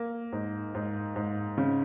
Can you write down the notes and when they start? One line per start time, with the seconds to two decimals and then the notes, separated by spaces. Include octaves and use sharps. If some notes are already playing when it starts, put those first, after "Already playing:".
Already playing: A#3
0.32 G#2
0.75 G#2
1.16 G#2
1.58 C#3